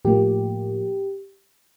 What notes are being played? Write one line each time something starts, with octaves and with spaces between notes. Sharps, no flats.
A2 F3 A#3 G4